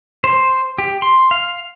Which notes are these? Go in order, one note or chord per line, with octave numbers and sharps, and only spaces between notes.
C5
G4
C6
F5